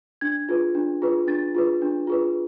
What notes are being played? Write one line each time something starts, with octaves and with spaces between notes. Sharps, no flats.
D4 G#6
F4 G#4 B4
D4
F4 G#4 B4
D4 A6
F4 G#4 B4
D4
F4 G#4 B4